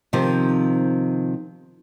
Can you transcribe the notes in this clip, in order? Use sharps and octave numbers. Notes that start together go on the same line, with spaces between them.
C3 D#3 F3 C4